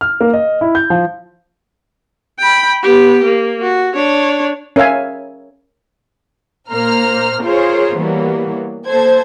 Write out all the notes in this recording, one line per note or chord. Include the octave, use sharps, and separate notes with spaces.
F6
A#3
D#5
E4
G6
F3
G5 B5
B3 G4
A#3
F#4
D4 C#5
C#4 A#4 C#5 E5 F5 G#5
A#2 A#3 C5 A#5 F6
F4 G#4 A#4 C5 C#5
E3 F#3 G3 A#3 B3
A#3 A4 C5 G#6